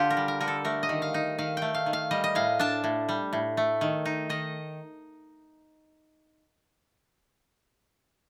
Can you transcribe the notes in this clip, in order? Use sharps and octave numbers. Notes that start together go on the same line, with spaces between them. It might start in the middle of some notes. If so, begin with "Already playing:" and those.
Already playing: D3 D4 F4 G4
A#4
G3
A#4
D3 A#4
A4
A3 A#4
D#5
D#3
F5
D#4
D#3 F5
A3 G5
F5
D#3
F5
G3 D#5
D#5
A2 F5
D4 A5
A2
G3
A2
A3
D#3
D#4
D#3 D#5